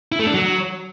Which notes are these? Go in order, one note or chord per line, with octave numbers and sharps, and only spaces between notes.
E4
A3
D4
F#3